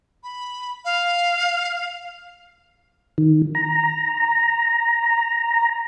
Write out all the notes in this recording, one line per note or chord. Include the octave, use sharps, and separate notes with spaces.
B5
F5
D#3
A#5